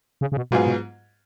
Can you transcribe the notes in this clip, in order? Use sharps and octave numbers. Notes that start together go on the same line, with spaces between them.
C#3
C#3
B2
G#2 B2 F#3 B3 F4 G#4
B2